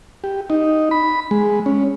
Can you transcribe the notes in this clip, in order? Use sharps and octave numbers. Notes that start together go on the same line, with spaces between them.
G4
D#4
B5
G#3
C#4